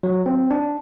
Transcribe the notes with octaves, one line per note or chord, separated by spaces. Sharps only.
F#3
C4
D4